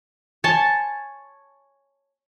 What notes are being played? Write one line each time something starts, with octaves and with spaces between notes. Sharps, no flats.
C#5 G#5 A5 C6